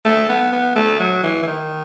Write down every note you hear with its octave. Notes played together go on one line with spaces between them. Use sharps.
A3
B3
B3
A3
F#3
E3
E3
D#3